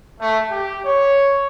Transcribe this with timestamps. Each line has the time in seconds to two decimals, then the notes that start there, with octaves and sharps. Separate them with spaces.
0.19 A3
0.50 G4
0.85 C#5